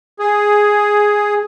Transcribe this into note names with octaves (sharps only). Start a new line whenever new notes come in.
G#4